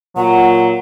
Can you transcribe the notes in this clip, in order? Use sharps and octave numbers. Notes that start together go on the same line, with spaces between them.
A#2 F#3 F#5